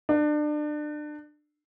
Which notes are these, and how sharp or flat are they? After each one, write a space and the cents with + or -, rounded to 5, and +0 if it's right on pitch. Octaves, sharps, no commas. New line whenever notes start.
D4 +30